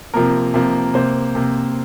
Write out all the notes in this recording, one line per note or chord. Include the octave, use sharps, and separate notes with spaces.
C3 F3 A#3 A#4
C3 F3 A#3
C3 A#3 C5
C3 A#3